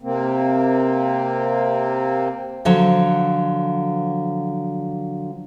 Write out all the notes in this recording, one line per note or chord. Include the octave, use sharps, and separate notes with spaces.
C3 A#3 C4
D3 F3 F#3